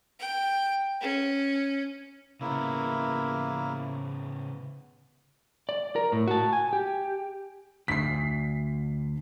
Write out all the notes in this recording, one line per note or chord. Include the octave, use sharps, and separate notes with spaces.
G5
C#4
C#3 A#3 B3 E4
D5
A#4
A2
F#4 A5
G#5
G4
D2 B6 C7